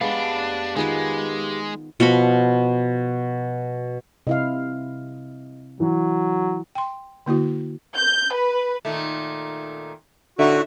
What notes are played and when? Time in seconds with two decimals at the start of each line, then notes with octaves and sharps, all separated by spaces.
0.01 G#3 B3 D4 G4 F5
0.76 D#3 G#3 B3 F4 G#4 B4
2.00 B2 F3 F#4 B5
4.27 C3 E4 D#5 F5
5.80 E3 F#3
6.75 G5 C6
7.26 D3 A#3 E4 F#4
7.97 G6
8.35 B4
8.85 A#2 D#3 A3
10.39 A2 D3 D#4 F#4 E5